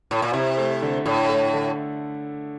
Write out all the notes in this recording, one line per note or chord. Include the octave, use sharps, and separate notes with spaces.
A2
A#2
C3 E4
A3
D3
A2 D3
A3
D3